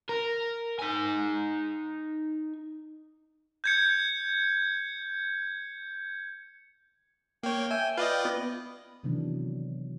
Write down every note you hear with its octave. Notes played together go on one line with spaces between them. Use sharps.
A#4
D#4 G#5
G6 G#6 C#7
A#3 C#5 G5
E5 G#5
F4 B4 D5 D#5
B3
C3 D#3 E3 F#3 B3 D4